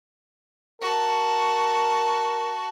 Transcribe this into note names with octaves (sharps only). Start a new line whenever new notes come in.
F#4 A#4 A5